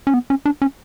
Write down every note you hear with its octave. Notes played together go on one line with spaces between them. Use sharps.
C#4
B3
C#4
D4
C#4